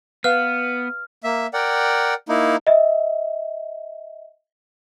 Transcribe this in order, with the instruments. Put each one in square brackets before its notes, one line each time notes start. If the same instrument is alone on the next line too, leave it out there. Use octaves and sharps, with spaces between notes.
[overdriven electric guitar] B3 [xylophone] B4 F5 [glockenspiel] F6
[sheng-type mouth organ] A#3 E5
A#4 D5 F#5 G5
A#3 D#4 E4
[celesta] D#5 E5